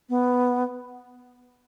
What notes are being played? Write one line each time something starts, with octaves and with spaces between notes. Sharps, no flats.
B3